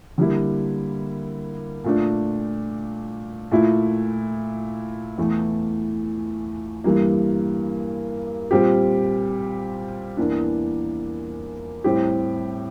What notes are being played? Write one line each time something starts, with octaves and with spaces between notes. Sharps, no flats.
D3 G3 A#3 E4
A#2 A3 D4
A#2 A3 E4
E2 E3 A3
G2 E3 G3 A#3
A#2 G3 C4 G4
E2 E3 A#3 D4
A2 G3 C4 G4